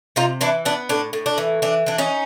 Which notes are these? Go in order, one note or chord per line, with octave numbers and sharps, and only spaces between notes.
C3 D#4 F4
E3 D4 E4
B3 D4
A2 D4
A2
D4
E3
E3 D4
E3 D4
C#4 D#4